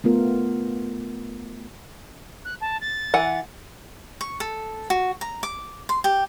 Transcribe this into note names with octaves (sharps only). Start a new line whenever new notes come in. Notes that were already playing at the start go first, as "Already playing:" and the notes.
A3 B3 F4 A#4
F#6
A5
A6
E3 F#5
C#6
A4
F#4
A#5
D6
C6
G4